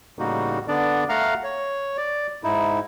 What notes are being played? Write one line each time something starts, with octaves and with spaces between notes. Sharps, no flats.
A2 C#3 G3 A#3 D#4 F#4
D3 B3 D4 D5
A3 F5 F#5 A#5 F6
C#5
D5
G#2 D#4 E4